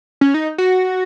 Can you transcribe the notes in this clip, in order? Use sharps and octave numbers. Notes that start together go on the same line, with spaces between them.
C#4
D#4
F#4